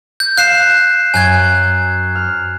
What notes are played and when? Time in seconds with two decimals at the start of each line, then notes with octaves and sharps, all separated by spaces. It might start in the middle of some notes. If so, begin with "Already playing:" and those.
0.20 G6
0.37 F5 F#6 C7 E7
1.14 F#2 G#5 F#6 G#6
2.15 F6